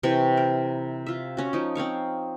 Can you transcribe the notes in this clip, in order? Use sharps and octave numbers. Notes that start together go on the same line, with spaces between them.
C3 E3 G5 C#6
A#4
F4 E5
C#4 F#4
F3 D#4
C4 C#5 F5 C#6